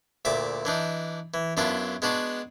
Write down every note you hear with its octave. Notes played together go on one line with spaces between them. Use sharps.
D2 A#2 E5 D6
E3 D4 D#4
E3
F#2 B3 D4 E4 F4
G#3 B3 D4 F#4